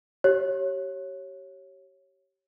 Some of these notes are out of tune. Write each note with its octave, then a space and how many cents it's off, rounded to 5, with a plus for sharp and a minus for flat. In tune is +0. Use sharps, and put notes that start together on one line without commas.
G4 -30 C#5 -15